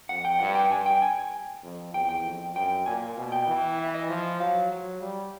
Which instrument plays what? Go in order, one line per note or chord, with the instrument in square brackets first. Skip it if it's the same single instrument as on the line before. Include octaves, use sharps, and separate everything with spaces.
[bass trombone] F2 [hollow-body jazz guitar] F#5
[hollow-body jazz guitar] G5
[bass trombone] G2 [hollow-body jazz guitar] F#5
[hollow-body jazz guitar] G5
[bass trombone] G2 [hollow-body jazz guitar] G#5
[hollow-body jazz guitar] G5
G#5
[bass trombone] F2
[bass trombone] E2 [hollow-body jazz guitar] G5
[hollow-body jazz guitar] G5
[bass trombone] F2
[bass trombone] F#2 [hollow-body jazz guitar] G5
[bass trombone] A#2 [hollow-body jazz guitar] G#5
[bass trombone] B2
[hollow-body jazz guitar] G5
[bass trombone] E3 [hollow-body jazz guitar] G5
[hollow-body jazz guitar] E5
D#5
[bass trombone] F3
[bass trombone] F#3 [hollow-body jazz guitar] F5
[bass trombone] F#3
G3